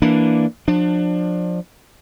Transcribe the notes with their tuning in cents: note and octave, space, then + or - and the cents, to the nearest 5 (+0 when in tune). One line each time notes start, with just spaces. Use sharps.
E3 +0 A#3 +0 D4 +0
F3 +30 D4 +25